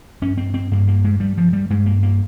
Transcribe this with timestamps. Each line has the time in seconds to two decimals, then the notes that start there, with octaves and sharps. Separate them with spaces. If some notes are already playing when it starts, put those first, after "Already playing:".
0.22 G2 C#4
0.38 C4
0.54 C4
0.71 G2 A#3
0.88 A#3
1.04 G#3
1.20 G2 G3
1.38 F3
1.53 G3
1.70 G2 G#3
1.86 A#3
2.03 A#3